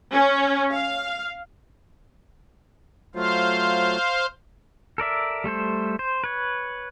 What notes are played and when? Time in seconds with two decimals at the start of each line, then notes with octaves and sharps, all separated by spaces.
0.12 C#4
0.72 F5
3.15 F#3 A3 F4 C5 F5
4.98 A4 A#4 D5 E5
5.44 G3 A3 A4 C5
5.99 C5
6.24 B4 C#5